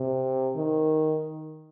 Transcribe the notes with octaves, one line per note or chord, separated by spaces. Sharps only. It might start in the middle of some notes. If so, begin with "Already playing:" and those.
Already playing: C3
D#3